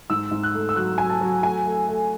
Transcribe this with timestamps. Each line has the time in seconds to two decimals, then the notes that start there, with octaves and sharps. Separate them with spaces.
0.10 G#2 E6
0.31 G#2
0.43 F#6
0.54 A3
0.69 E6
0.76 F#3 F#6
0.98 F#3 G#5
1.10 A5
1.21 F#3
1.43 A3 G#5
1.66 A3
1.88 A3